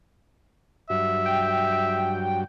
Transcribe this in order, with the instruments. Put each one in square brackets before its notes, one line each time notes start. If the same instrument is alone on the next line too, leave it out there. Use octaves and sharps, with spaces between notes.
[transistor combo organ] G2 F#3 [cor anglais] E5
[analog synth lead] G5